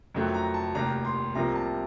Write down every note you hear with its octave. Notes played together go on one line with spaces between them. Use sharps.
F2 D#3 F#3 A3
A#5
A5
F1 D#2 D#3 A#5
C6
C2 C3 F3 A#3 A#5
A5